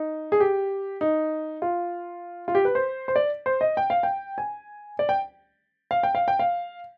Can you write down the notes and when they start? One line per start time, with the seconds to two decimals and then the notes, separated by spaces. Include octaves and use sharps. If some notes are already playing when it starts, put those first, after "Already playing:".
Already playing: D#4
0.32 G#4
0.40 G4
1.01 D#4
1.62 F4
2.48 F4
2.55 G4
2.65 B4
2.75 C5
3.08 C5
3.16 D5
3.46 C5
3.61 D#5
3.77 G5
3.90 F5
4.03 G5
4.38 G#5
4.99 D5
5.09 G5
5.91 F5
6.03 G5
6.15 F5
6.28 G5
6.39 F5